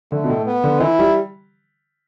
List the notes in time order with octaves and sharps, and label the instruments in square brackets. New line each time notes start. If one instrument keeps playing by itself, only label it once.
[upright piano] D3 [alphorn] A3
[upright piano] B2
A2
[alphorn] B3
[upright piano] D3
[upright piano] E3 [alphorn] E4
[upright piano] G3